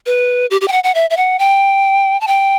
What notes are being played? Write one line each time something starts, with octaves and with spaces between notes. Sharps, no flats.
B4
G4
G4
G5
F#5
F#5
E5
E5
F#5
G5
A5
G5